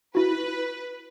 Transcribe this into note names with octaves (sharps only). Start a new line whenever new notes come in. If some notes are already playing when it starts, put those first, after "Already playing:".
E4 F#4 B4